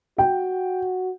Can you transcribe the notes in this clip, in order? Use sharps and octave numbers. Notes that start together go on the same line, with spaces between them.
F#4 G5